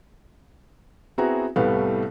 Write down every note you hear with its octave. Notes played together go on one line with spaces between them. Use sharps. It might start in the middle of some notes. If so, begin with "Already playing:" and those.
B3 C4 E4 F#4 G#4 A#5
C2 A2 G3 A3 B3 F5